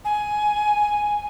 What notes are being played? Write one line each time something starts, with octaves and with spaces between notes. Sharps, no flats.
G#5